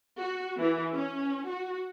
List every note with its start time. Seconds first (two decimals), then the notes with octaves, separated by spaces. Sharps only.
0.19 F#4
0.58 E3
0.96 C#4
1.48 F#4